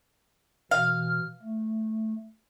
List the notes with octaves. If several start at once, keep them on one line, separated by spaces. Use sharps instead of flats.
B2 E3 F5 F6
A3